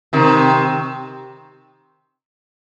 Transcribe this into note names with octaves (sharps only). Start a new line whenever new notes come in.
C3 D#3